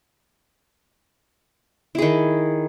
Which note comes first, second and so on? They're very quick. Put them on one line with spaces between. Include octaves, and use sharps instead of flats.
E4 G#4 D#3